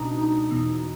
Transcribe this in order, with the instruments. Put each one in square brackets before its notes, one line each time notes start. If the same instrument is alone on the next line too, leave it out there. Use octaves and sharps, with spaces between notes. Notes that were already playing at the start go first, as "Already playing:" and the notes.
Already playing: [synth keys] C#2 B2 D4 D#4
D#4
E2 B2